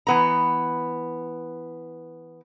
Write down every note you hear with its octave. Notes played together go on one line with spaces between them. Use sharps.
E3 B3 A#5